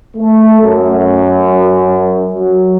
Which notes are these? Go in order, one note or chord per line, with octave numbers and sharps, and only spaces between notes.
A3
F#2
F#3